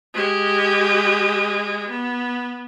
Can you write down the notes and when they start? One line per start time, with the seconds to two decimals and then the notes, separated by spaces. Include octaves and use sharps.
0.14 G#3 G4
1.90 B3